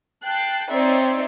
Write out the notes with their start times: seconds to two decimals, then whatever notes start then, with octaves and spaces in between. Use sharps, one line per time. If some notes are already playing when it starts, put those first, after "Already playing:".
0.24 G5 A5 F#6 C7
0.71 C4 D#4 C#5 D5 E5 C6